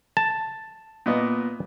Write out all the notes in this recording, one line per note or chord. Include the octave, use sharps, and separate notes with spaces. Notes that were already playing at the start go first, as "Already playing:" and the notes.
A5
A#2 B3 D#5